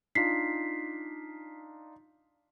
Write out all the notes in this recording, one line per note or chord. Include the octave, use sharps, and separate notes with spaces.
D4 D#4 F4 B6 C7